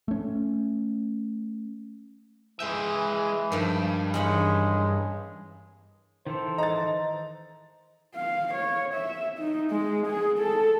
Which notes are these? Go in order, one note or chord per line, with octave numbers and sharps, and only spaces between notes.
A3 C#4
E3 G#3 E5 G5
G2 D#3 F3
E2 G#3 C#4 B5
D#3 E3 A4 C5
D#5 A#5 A6
F5
C#5
E5
D#4
G#3
G#4
A4